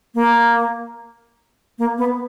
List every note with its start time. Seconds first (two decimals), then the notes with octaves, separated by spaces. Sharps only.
0.15 A#3
1.78 A#3
1.98 B3